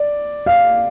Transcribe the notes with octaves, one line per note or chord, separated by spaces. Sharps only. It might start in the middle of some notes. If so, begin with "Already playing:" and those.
Already playing: D5
F5